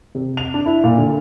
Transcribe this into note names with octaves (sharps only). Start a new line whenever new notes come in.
C3
F7
D4
E4
A#2
D3